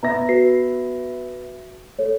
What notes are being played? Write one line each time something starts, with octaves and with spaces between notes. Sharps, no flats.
B3 E5 A#5 A#6
F#4 B4 C7
A4 C#5